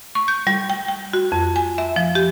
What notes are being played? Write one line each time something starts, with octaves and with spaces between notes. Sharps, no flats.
C#6
G6
G3
G5
G5
F#4
F2
G#5
E5
F3
G4